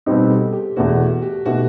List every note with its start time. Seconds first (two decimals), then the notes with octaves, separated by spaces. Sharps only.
0.06 B2 G3 C4 D#4 G4
0.26 A4
0.30 G4
0.53 G4
0.76 E2 B2 A3 F#4
1.22 G4
1.46 B2 A3 D#4 F#4 G4